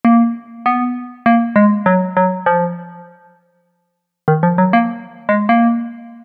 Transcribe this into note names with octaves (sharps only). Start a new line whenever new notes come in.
A#3
B3
A#3
G#3
F#3
F#3
F3
D#3
F3
F#3
A#3
G#3
A#3